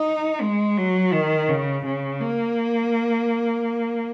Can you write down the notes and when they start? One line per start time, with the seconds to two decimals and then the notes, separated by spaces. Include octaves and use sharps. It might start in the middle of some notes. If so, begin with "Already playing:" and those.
Already playing: D#4
0.41 G#3
0.78 F#3
1.13 D#3
1.49 C#3
1.85 C#3
2.21 A#3